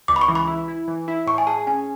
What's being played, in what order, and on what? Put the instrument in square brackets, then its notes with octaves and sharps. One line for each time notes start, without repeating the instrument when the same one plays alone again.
[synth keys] C#2 [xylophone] D6
[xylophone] B5
C#6
[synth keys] E3
[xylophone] B5
[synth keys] E4
E4
E3
E4
[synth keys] A2 [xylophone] C#6
[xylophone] G#5
[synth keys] G#4 [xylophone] A5
[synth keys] C#4 [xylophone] G#5